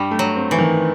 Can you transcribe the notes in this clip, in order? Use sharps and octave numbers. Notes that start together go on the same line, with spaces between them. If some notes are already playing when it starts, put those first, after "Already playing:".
Already playing: G2 G3
A3
F#3
C4
E3
D#3